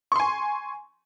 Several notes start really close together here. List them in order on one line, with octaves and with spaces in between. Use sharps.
C#6 C6 G#5